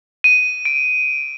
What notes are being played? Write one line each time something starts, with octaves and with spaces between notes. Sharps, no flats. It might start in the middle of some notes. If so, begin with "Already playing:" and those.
D#7
D7